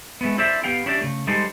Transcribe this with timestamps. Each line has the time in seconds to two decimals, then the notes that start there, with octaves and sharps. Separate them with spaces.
0.21 G#3 A3 B3
0.38 C4 E4 A4 C5 D5 E5
0.64 B3 G4 F5 G5
0.86 C#4 D4 E4 G4 D5
1.01 C#3 A3
1.27 G3 G#3 D#4 A4 C5